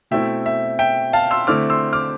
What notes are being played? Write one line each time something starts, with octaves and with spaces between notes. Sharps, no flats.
B2 A3 C4 E4 E5 G5
E5
E5 G5
F5 A5
C6 E6
D3 A3 C4 E4 D6 F6
C6 E6
D6 F6